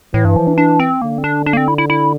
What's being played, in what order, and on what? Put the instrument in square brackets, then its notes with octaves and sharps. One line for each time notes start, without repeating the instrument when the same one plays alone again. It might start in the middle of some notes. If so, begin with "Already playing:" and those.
[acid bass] A2 [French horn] E3
[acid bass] G2
F3
D4
D4
C4
[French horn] D3 [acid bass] A#3
[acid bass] C4
D4
D4
A#3
C4
E4
E4
E4